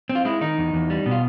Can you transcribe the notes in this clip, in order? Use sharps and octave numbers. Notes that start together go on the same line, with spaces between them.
C4
F4
G#3 E4
D#3 D#4
E2
E2
G3
B2
F4